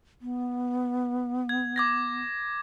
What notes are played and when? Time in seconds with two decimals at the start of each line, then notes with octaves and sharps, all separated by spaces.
0.22 B3
1.49 G#6
1.76 D6 G#6 A#6